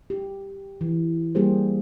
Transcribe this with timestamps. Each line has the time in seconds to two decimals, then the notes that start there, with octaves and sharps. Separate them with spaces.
0.10 G4
0.81 E3
1.35 G3 A#3 G4 G#4 A#4 C5